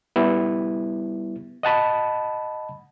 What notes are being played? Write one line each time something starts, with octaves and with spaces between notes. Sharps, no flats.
G3 B3 E4
D#5 F#5 A5 B5